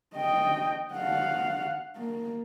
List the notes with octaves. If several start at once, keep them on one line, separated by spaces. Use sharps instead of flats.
D#5 G5
F5 F#5
A#3